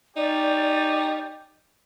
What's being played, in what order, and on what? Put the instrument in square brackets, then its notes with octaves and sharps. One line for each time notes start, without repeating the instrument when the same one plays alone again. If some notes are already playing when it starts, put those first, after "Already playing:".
[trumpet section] C#4 G4 [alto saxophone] D#4 [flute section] D5